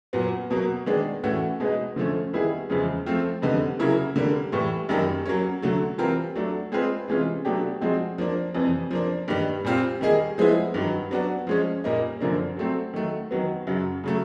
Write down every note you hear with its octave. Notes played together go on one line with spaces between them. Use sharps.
A#2 F#3 B3
B2 F#3 A#3
D#3 G#3 B3 D4
A2 E3 A3 C#4 F#4
B2 G#3 B3 D#4
D3 F3 A3 C#4
D#3 G3 B3 E4 G#4
E2 C#3 F3 G#3
F3 A3 C4 F4
F2 D3 G3 B3 D#4
C#3 F#3 A#3 C#4 E4
D3 G3 A#3
A2 E3 G3
F#2 D#3 G3 A#3 D#4
F#3 A#3 C#4
D3 F#3 A3
E3 G3 C4 F4 A#4
F#3 A3 D4
G#3 C4 F4 G#4 B4
C3 E3 G#3 C#4 F4
B2 F#3 A3 D4 G4
F3 G#3 C4 D#4 F#4
F3 A#3 D4
F2 C3 E3
F3 A#3 D4
G2 D#3 G3
A#2 G3 C4 F4
D#3 G3 A#3 D#4 G#4
F3 G#3 B3 E4
G2 D#3 F#3
F#3 B3 D4 F#4
F3 G#3 C#4
A#2 G3 A#3 D#4
F#2 D3 F3 A#3 D4
F#3 A3 C4
D#3 F#3 A3
D#3 F#3 B3
F#2 C#3 F#3
C#3 F#3 A3